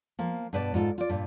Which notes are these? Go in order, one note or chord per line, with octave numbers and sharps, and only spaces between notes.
F3 A#3
G2 B2 B4 D5 A5
G#2 F4 F#4 A4
F4 D5
G2 A#2